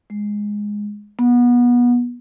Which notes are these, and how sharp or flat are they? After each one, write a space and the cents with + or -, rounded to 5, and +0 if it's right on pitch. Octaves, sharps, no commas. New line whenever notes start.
G#3 -5
B3 -25